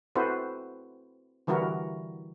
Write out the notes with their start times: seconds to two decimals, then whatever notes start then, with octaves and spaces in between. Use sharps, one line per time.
0.16 C4 E4 F#4 A4 B4 C5
1.47 D3 E3 G3 E4 F#4 A#4